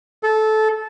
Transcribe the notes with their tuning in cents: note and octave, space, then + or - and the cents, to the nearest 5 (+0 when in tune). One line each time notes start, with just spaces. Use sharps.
A4 -15